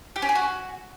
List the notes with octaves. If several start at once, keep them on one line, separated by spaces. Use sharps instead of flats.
G4
C#4
G#4
F#4